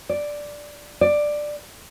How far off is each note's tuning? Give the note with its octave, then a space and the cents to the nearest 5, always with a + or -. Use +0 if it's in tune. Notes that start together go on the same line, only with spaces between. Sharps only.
D5 +0
D5 +10